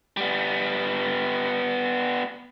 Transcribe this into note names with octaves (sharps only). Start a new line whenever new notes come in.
G3 B3